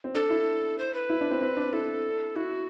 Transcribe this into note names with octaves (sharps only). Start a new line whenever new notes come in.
C4
D4 A4
E4
C5
B4
E4
D4
C4
C4
D4
E4 A4
E4 F#4